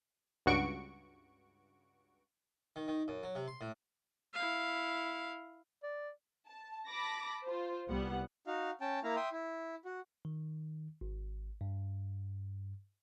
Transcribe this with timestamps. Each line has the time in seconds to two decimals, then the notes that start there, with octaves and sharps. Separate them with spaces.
0.46 C#2 G2 F#4 C#6 D7
2.76 D#3
2.88 D#3
3.08 F#2
3.23 F#3
3.35 C3
3.48 C6
3.61 A2
4.34 E4 F5
5.83 D5
6.47 A5
6.88 A5 B5 D6 A#6
7.44 F4 C5
7.88 C2 G3 B3 F#5
8.47 D#4 F#4 F5
8.81 C#4 G5 A5
9.04 A#3 E4 F5 A#5
9.16 E5 G5 C6 D#6
9.32 E4
9.85 F#4
10.25 D#3
11.01 G#1
11.61 G2